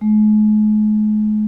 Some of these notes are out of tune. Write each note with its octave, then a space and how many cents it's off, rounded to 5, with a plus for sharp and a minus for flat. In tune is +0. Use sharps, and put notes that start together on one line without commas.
G#3 +45